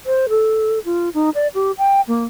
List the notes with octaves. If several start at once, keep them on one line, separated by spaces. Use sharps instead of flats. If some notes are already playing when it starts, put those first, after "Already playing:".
C5
A4
F4
D#4
D5
G4
G5
A#3